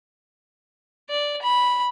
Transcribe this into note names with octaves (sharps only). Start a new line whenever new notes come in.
D5
B5